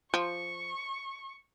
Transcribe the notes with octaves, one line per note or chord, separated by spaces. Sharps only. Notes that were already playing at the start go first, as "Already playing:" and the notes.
F3 C#6